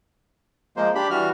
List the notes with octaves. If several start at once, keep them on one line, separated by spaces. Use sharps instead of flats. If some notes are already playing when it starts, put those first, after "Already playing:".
F3 G#3 A#3 C5
D4 G4 B5
E3 G3 F#4 F6